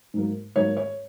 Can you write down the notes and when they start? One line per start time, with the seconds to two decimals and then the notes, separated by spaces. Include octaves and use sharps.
0.14 G#2 F#3 A#3
0.56 G#2 F#3 A#3 C#5
0.77 C#5